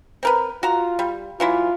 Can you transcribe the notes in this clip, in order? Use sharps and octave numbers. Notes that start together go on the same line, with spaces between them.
C4 A#4 B4
F4 F#4 A#5
G3
E3 F#3 E4 F4